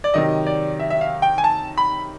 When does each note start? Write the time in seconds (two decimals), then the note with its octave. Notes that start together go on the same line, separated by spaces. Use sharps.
0.04 D5
0.14 C3 D#3 F#3 D#5
0.47 D5
0.80 E5
0.90 E5
1.01 F5
1.22 G5
1.38 G#5
1.44 A5
1.78 B5